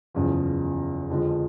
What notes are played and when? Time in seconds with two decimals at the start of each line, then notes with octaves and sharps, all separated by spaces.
0.14 F#1 E2 C#3 F3
1.10 F2 D3 F3 G#3